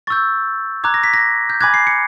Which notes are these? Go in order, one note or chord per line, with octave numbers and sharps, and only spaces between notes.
C#6 E6 G6 A6
A#5 D6 F#6 G#6
A#6
B6
A#6
G6
G#5 B5 D6 F#6 G#6
C7
C#7